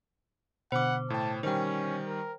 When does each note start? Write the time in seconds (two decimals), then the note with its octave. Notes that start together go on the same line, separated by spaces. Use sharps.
0.72 B2 D3 C5 F#5 B5 D6
1.10 A2 G5 A5
1.43 D#3 G3 C#4 C5 G5
2.05 A#4